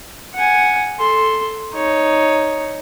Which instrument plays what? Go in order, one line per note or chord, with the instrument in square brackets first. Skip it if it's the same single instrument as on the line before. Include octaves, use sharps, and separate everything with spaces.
[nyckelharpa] F#5 G#5
A4 C6
D#4 C#5